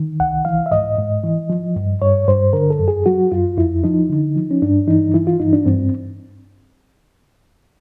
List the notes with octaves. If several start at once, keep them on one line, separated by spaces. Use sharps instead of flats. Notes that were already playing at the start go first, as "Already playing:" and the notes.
Already playing: D#3
C2 F#5
E3 F5
E5
G#2 D#5
G#2
E3
F3
G2
G2 C#5
G2 C5
D3 A#4
A4
F#2
G#4
F#3 F#4
F#2 F4
F2 E4
F3 D#4
D3
F3
C#4
G2 D4
E3 D#4
E3 E4
F4
G2 D#4
D4
G2 C4